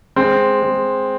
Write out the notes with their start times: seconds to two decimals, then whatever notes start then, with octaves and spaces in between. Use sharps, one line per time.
0.16 G#3 C4
0.62 G#3